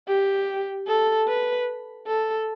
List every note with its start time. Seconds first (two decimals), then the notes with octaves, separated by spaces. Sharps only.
0.08 G4
0.87 A4
1.28 B4
2.07 A4